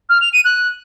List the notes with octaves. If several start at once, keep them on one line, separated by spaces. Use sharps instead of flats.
F6
F7
D#7
F#6